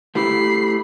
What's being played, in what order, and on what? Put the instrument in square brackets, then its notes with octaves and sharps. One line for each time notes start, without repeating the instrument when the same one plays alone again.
[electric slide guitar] A3 E4 G4 [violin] B5 C7